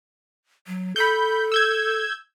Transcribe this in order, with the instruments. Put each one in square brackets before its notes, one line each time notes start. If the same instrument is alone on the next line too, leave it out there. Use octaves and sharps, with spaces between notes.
[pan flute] F#3
[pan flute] A4 [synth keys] B5 G6
[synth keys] E6 G6 G#6